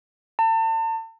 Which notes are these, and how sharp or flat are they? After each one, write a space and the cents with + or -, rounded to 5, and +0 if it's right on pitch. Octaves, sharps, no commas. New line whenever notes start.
A5 +40